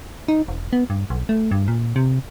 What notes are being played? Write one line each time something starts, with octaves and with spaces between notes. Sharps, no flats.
D#4
E1
B3
G2
B1
A3
G2
A#2
C3